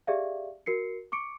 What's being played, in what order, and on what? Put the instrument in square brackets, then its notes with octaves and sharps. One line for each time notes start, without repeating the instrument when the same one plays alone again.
[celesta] G4 G#4 D5 E5 F5
F#4 A#4 C7 C#7
C#6 D6 C#7 D7